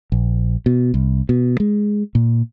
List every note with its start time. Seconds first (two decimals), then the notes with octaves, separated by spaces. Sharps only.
0.12 A#1
0.66 B2
0.94 C2
1.29 B2
1.60 G#3
2.15 A#2